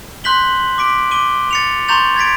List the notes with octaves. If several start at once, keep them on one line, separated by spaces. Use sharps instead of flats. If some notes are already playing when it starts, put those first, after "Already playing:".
C6 F#6 G6 B6 F#7 G7
D6 B6 D7
D6 D#7 G7
A6 C#7 F7
A#5 C6 C#6 G6 A6 F7
G#6 A6 B6 D7